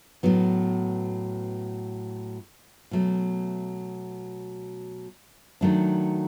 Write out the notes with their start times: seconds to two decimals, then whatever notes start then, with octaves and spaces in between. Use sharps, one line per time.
0.23 A2 F#3 B3
2.91 B2 F#3 A3
5.61 D#3 F#3 A3 D4